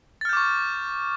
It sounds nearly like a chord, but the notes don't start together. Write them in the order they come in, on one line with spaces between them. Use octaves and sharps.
A6 F6 G6 D6 C#6